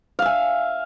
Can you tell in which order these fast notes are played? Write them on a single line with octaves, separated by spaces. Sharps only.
F5 E5 G#5